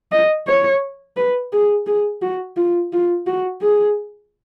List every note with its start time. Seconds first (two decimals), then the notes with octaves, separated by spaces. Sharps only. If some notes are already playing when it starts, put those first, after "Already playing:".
0.12 D#5
0.47 C#5
1.16 B4
1.53 G#4
1.86 G#4
2.22 F#4
2.57 F4
2.93 F4
3.27 F#4
3.62 G#4